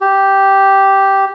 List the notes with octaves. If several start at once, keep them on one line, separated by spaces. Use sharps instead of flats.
G4